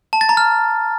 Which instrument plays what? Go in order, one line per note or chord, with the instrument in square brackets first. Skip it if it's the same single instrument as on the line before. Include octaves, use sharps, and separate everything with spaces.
[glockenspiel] A5
A6
A#5
F6